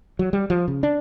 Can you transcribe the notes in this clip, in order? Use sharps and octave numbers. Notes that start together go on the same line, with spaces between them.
F#3
G3
F3
C#3
D4